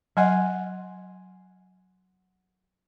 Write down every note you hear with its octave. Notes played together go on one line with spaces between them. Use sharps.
F#3 D#5 F#5 G#5 C6